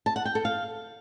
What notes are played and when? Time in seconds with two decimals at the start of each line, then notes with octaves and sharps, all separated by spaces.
0.06 A5
0.16 F#5
0.25 G5
0.35 A4
0.45 F5